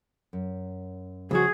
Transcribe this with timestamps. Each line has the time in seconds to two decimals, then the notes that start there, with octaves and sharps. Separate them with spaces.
0.33 F#2
1.31 C#2 F3 G3 F#4 G#4